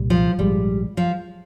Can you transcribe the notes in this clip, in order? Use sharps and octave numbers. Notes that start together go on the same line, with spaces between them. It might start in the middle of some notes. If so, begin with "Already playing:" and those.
Already playing: C2 A#2 G3
F3
A#1 G#2 F3 G3 G#3
F3